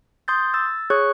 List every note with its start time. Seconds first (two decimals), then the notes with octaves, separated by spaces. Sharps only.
0.28 C6 D#6 G6 A6
0.54 E6 A6
0.90 G#4 C#5 C#6 F#6